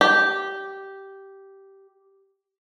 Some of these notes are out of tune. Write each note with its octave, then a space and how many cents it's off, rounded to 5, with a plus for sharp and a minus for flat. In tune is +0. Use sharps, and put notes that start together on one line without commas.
G4 -10